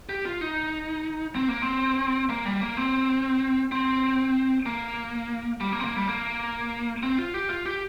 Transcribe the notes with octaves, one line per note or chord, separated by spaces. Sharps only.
G4
F4
D#4
C4
A#3
C4
A#3
G3
A#3
C4
C4
A#3
G3
A#3
C4
A#3
G3
A#3
C4
F4
G4
F4
G4